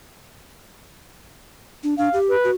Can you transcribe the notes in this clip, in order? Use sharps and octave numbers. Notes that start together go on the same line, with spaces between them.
D4
D4 F5
G4
B4
F#4